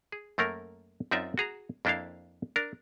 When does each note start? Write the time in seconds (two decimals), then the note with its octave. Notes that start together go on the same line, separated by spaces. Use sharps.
0.12 G#4
0.38 F#2 A3 A#3 A#4
1.11 F#2 C4 D#4 F4 D5 E5
1.38 F#4 G#4 A#5
1.85 F2 A#3 D4 E4 C5 F5
2.56 D4 A#4